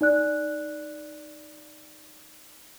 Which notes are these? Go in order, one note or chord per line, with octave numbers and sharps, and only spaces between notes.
D#4 D5 F#6